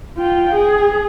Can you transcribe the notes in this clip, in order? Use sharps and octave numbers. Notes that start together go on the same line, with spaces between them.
F4 G5
G#4